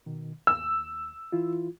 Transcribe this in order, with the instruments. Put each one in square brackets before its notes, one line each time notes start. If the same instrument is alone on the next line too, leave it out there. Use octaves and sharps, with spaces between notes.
[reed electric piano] B2 D#3
[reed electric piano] D#2 [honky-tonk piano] E6
[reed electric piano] E3 E4 F4